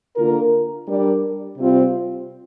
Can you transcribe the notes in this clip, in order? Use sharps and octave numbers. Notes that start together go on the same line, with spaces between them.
D3 A#3 F4 A#4
G3 D4 A#4 D5
C3 G3 C4 F4 C5